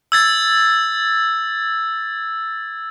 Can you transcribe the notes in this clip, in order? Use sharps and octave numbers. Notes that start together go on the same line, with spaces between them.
E6 G#6 A6